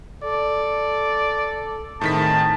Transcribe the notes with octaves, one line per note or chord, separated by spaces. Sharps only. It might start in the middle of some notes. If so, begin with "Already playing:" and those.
A4 D5
A2 D#3 C4 G#4 A5 B6